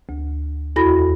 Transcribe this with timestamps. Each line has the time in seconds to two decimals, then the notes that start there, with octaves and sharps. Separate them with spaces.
0.09 D2
0.76 E2 E4 F#4 A4 B5 A#6